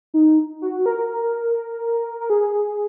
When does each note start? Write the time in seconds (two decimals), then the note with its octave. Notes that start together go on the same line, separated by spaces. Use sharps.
0.14 D#4
0.62 F#4
0.86 A#4
2.21 A#4
2.30 G#4